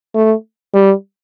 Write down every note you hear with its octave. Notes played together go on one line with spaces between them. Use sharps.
A3
G3